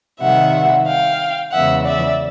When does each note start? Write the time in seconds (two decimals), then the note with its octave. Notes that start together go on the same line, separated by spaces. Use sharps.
0.21 C3 D#3 G3 E5 F#5
0.88 F5 G5
1.53 E2 C#3 E3 G#3 B3 E5 F#5
1.87 D5 E5